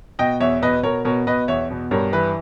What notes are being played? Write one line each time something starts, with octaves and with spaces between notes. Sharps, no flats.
B2 D#5 G5
E2 C#5 E5
B2 B4 D#5
B2 A#4 C#5
B2 A#4 C#5
B2 B4 D#5
E2 C#5 E5
B2
G2 A#4 C#5
E3 B4